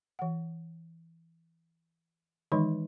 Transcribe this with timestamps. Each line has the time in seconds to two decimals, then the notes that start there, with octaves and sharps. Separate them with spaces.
0.19 E3 F#5
2.52 D#3 E3 G#3 D#4 B4 D#5